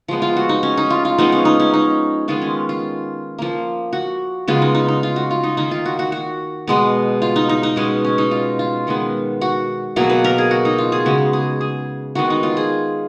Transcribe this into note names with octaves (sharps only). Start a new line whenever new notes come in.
F3 G#3 B3
F4
F#4
D#4
C#4
D#4
F4
F4
F3 G#3 B3 D#4
C#4
D#4
C#4
D#4
D#3 G#3 B3 F4
C#4
F4
F3 A#3
F#4
C#3 G#3 B3 F4
D#4
D#4
D#4
F4
F#4
F4
D#4
D#3 A#3 D#4
F4
F#4
F#4
F#4
B2 G#3 B3
F4
D#4
D#4
D#4
B2 G#3 B3 C#4
C#4
D#4
F4
F4
D#3 G#3 B3
F#4
B2 F#3 A#3 G#4
B4
A#4
G#4
F#4
D#4
F4
G#4
C#3 G#3 B3 F#4
G#4
G#4
D#3 G#3 B3 F#4
D#4
F4
G#4